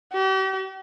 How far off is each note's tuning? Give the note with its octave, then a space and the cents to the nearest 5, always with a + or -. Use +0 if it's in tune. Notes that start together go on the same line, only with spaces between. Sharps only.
G4 -40